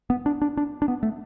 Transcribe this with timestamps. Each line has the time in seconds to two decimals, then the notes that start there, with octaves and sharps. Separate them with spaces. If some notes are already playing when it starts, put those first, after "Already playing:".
0.10 B3
0.26 D4
0.42 D4
0.57 D4
0.82 D4
0.88 B3
1.03 A3